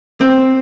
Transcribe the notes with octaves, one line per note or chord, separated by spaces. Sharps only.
C4